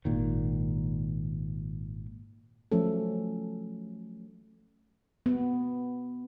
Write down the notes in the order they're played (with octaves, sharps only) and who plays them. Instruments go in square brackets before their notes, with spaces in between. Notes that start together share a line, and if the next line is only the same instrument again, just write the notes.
[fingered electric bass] G#1 A#2 D#3
[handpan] F3 F#3 A3 C#4 A4
B3